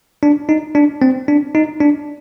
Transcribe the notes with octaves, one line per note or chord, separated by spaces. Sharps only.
D4
D#4
D4
C4
D4
D#4
D4